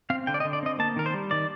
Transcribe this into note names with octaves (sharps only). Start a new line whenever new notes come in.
C4 F5
D3 G5
D5
D#5
D3
D5
C4 D#5
A#3 A5
D#3 A#4
C5
G3
D#3 D5